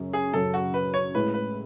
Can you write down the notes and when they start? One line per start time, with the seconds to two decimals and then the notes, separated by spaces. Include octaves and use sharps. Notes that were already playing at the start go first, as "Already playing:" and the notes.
Already playing: F#2 C#3 F#3 C#4
0.13 G#4
0.33 F#2 C#3 F#3 C#4 A4
0.54 F#4
0.74 B4
0.94 C#5
1.14 A2 G#3 C#4 E4 B4
1.34 B4